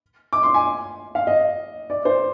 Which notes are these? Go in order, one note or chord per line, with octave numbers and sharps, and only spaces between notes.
D6
C6
G#5
F5
D#5
D5
C5